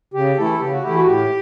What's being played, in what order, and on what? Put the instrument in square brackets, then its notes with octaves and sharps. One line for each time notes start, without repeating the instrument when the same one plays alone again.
[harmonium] C#3 G4
E3 A3 E4 A4
C#3 G4
F#4
E3 A3 E4 G4
F#4
A2 G4